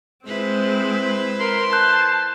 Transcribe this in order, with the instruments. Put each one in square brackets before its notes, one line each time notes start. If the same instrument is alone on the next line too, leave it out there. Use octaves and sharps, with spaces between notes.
[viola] G#3 C4 [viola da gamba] E4 B4 C5
[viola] A#4 [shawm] C6
[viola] A5 [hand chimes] F#6 G6